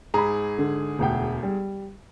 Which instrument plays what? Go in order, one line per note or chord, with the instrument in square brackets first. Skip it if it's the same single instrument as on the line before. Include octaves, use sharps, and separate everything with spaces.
[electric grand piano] G#2 G#4 [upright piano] A#5 B5
[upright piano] D3
E1 D2 G5
G3